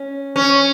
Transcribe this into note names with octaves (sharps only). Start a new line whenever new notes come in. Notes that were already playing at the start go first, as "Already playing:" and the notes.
Already playing: C#4
C#4